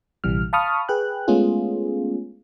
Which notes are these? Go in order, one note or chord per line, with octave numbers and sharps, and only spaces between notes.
A#1 C3 E3 G3 F6
F5 A5 B5 C#6 D#6 F6
G#4 B4 G5 F#6
G#3 A3 B3 C#4 F4 G#4